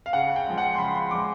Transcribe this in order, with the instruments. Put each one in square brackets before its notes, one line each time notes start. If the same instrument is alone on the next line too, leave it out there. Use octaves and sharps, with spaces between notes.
[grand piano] F5
C#3 F#5
G5
F3 G#3
F#5
C6
C#3 B5
C6
F3 G#3 D6